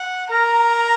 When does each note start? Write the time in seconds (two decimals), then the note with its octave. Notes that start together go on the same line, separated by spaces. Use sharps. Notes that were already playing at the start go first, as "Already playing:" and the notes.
Already playing: F#5
0.31 A#4 A#5